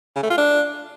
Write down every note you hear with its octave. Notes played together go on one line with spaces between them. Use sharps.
C#3
A3
F4
D4